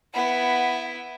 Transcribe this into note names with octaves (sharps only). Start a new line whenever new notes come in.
B3 E4 F#5